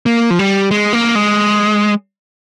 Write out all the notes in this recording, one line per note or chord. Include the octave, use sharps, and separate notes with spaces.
A#3
F3
G3
G#3
A#3
G#3